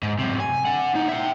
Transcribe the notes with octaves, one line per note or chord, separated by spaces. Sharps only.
G#2
F#2 C3
G#5
D4 F#5
A2 D#4
E5 G5